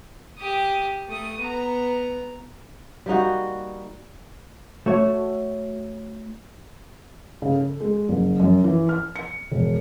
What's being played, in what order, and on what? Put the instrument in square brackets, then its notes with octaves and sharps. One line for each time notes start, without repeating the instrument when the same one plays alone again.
[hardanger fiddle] G4 D#6
A3 D#6
B3 A#5
[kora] G3 A#3 D#4 F#4
[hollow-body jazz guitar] A3 F#4 C#5
[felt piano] C#3
A4
G#3
F#1
F#2
E3
F6
C#7
E1